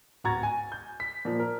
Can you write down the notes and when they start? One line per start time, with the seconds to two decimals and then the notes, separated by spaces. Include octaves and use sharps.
0.24 D1 F#4 A#5 C#6 G#6 A6
0.43 G#5
0.72 G6
1.00 B6
1.25 A#2 F3
1.40 A#4